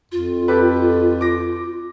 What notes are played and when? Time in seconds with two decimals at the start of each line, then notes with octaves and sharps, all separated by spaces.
0.12 F2 F4
0.48 G4 A4 B4
1.21 D6 A#6